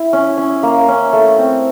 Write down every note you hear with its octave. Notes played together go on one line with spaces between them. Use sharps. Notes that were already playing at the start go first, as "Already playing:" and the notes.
Already playing: E4
C#4
C#4
A#3
C#4
A3
C4